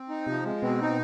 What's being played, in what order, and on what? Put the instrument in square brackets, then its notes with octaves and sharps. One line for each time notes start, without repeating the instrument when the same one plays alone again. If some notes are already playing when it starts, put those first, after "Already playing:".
Already playing: [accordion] C4
D#4
[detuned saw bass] C3 [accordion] F3
[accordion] G#3
[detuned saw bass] B2 [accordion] C4
[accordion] D#4